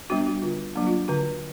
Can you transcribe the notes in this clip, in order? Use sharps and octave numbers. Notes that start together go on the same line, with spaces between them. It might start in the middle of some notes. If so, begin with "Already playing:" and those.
G3 B3 D4 F#4
F#4
D3 F4
F#3 A#3 D4
F4
D3 F#4